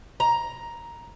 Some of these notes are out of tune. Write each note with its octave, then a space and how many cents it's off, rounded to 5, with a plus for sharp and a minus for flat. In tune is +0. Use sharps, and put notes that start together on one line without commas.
A#5 +10